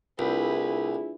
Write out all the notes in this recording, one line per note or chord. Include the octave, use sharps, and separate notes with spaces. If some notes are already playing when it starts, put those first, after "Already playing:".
C2 A3 D4 E4 F4 G#4 B4